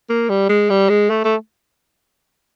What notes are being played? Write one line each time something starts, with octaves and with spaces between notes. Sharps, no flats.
A#3
G3
G#3
G3
G#3
A3
A3